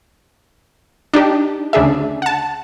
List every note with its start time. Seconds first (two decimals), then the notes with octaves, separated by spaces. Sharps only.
1.14 D4 D#4 G4
1.73 D2 C#3 D4 G#4 E5
2.22 F#5 A5